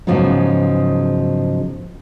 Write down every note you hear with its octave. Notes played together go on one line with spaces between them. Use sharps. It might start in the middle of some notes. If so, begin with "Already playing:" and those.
G#2 C#3 F3 F#3 B3 D#4